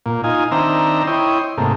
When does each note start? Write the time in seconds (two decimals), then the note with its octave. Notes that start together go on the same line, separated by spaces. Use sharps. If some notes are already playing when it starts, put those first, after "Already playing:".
0.06 A#2
0.24 D#4 F4 G#5
0.51 D#3 C4 D4 C5 E5 A#5
1.07 E4 C#5 D#5 G5 C6
1.58 G#2 C3 A3 A#3